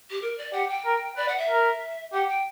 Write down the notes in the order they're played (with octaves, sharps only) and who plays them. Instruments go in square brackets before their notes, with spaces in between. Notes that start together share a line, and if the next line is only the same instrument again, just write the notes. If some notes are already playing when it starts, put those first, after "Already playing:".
[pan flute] G4
A#4
D5
[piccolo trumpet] G4 [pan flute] F#5
[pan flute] G5
[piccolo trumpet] A#4
[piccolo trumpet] B4 [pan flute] D5
[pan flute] F#5
E5
[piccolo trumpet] A#4
[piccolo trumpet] G4 [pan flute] F#5
[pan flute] G5